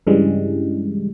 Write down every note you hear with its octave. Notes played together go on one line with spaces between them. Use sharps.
G2 C#3 E3 G3 G#3